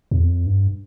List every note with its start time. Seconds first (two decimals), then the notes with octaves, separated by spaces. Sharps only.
0.11 E2
0.23 F2
0.47 G2